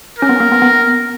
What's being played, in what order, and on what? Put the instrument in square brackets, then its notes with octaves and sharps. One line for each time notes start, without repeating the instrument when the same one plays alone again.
[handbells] C#4 [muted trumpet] A#4
[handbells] B3
A#3
B3
B3